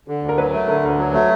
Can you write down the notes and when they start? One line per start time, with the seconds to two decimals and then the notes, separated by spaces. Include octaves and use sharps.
0.08 D3
0.23 D2
0.29 A#4
0.38 F#3 B4
0.53 A3
0.68 D3 A#4
0.84 D2 A#4
0.98 F#3
1.13 A3